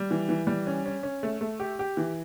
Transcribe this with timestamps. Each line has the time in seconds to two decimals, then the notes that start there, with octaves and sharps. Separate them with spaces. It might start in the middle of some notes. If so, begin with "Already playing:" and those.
Already playing: G3
0.11 E3
0.29 E3
0.47 G3
0.67 C#4
0.86 C#4
1.03 C#4
1.23 A3
1.41 A3
1.60 G4
1.79 G4
1.97 E3